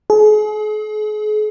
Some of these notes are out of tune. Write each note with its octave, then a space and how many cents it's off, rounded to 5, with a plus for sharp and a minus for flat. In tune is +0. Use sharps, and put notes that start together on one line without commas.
G#4 +40